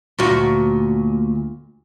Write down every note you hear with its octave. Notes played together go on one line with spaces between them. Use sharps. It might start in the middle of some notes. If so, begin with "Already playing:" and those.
D2 A#2 F#4